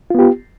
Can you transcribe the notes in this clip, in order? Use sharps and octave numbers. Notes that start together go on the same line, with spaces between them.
B3 F4 G4